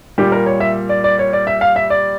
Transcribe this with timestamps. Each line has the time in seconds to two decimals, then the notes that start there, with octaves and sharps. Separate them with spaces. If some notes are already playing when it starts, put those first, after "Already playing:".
0.18 A#2 G3 G4
0.32 A#4
0.46 C#5
0.60 E5
0.89 D5
1.04 D5
1.19 C#5
1.33 D5
1.47 E5
1.61 F5
1.76 E5
1.90 D5